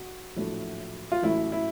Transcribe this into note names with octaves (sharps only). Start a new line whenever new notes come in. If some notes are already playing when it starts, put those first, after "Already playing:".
Already playing: F#4
A#1 A2 F#3 A3
F4
A1 A2 F#3 A3 E4
E4